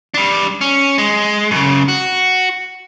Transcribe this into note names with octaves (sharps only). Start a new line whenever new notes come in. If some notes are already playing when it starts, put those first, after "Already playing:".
G3 D4
C#4
G#3
F#2 C#3
F#4